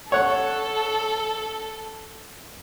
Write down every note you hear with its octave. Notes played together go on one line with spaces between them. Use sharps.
A4 C#5 F#5